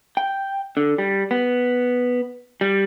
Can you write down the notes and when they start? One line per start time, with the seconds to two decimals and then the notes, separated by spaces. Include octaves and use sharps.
0.17 G5
0.77 D3
0.98 G3
1.31 B3
2.61 G3